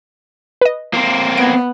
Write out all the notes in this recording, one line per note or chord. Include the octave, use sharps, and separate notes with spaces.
B4 D#5
A#3 C4
B3 G#6 A#6 D7